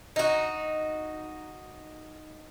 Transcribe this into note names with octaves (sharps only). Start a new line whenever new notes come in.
D#4 F#4